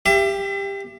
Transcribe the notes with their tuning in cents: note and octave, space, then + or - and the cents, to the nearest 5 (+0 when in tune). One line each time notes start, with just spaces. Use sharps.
G4 +15 E5 +35